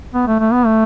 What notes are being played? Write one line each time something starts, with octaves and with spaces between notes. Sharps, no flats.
B3
A3
A3
B3
A3